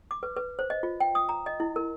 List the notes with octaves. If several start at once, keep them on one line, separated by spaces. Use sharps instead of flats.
D6
B4
B4
C5
D#5
F4
G5
D#6
A#5
D#5
E4
A#4